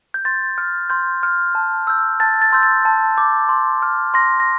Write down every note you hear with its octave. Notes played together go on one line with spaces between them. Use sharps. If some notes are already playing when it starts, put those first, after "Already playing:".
G6
C6 A6
F6
C6 G6
F6
A5
E6 G6
A5 A6
A6
C6 E6 G6
A6
A5
D6 G6
C6
F6
C6 A#6
A#6